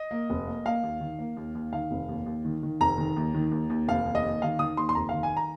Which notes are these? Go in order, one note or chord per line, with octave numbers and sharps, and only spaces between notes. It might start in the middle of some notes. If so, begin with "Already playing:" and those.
Already playing: D#5
A#3
F1
A#3
A#3 F5
D#2
D#3
A#3
D#2
D#2
D#3 F5
F1
D#2
D#2
D#3
D#3
F1 A#5
D#3
D#2
D#3
D#2
D#2
F1 F5
D#2
D#5
D#2
D#3 F5
D#3 D#6
D#2 C6
C6
F1 A#5
D#3 F5
G#5
A#5